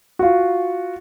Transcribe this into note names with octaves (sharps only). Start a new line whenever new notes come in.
F4 F#4